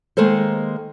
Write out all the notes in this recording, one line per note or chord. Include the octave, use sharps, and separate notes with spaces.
D#3 G#3 A#3 A4 C5